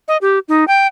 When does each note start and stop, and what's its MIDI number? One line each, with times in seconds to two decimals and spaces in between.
0.08 0.17 75
0.21 0.39 67
0.48 0.64 63
0.68 0.87 79